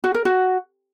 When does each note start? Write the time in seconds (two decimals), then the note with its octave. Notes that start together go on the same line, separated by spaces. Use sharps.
0.04 F#4
0.14 A#4
0.25 F#4